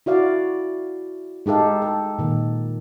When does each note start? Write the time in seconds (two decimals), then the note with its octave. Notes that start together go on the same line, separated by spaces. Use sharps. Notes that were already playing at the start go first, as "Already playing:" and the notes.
0.06 E4 F#4 D5 F5
1.46 G#3 D#4 G4 A4 F5
1.82 A4
2.18 A#2 D#3